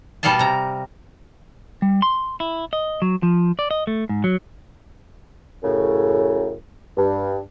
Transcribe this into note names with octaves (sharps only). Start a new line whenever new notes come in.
B2 G3 A4 D5 F5 A5
C3 A#5
G3
C6
E4
D#5
F#3
F3
D5
D#5
A3
G#2
F#3
F#2 A2 C#3
G2